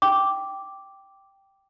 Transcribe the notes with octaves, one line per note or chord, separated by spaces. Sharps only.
G5 D6